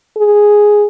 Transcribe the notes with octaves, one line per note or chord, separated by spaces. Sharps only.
G#4